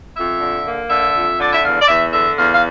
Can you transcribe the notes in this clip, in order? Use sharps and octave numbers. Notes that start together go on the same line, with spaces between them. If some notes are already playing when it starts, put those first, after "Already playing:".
F2 E5
D3
A#3
D3 E5
F2
D3 D5
E5
E2 F5
D5
E2 E5
D3 E5
E2 F5
F5